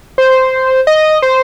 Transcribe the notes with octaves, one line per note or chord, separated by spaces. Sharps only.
C5
D#5
C5